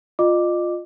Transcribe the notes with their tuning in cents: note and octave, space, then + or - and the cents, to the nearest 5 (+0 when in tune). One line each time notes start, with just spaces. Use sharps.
F4 +10 D#5 -30 D6 +0